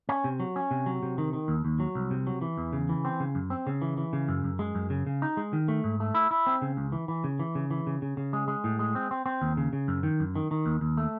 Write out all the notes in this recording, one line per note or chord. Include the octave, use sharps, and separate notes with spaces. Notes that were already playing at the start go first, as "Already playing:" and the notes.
C#4
C3
F#3
C#4
C3
F#3
C3
D#3
D#3
D#2
D#2
F#3
C2
C3
F#3
E3
E2
C#3
E3
C4
C#3
F#2
C4
C#3
E3
E3
C#3
F#2
F#2
G#3
F#2
C#3
C#3
D#4
G#3
D#3
A3
G#2
A3
E4
E4
C4
C#3
C#2
E3
E3
C#3
E3
C#3
E3
C#3
C#3
C#3
G#3
G#3
A2
G#3
C4
C4
C4
D#2
C#3
C#3
F#2
D#3
F#2
D#3
D#3
D#2
D#2
A3